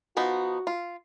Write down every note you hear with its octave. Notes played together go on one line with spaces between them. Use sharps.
F3 B3 D#4 F#4
F4